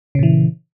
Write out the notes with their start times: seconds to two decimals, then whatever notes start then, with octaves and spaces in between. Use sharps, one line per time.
0.15 C#3
0.19 A#2
0.23 E3